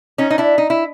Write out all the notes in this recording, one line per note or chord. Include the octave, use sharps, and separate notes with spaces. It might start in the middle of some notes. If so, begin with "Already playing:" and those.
C#4 D#4
D#4
D4 E4
D#4
E4